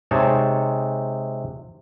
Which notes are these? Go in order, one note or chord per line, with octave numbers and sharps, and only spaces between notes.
C3 G#3 D#4 C#5 A5